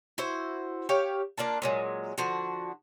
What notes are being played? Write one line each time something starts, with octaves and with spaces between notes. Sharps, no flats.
E4 F#4 C5
G4 C#5 F5
A#3 D4 F4 A5
A#2 F#3 G#3
D3 F3 F#4